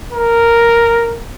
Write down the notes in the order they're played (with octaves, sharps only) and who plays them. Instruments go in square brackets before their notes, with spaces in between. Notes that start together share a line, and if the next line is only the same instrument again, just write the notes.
[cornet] A#4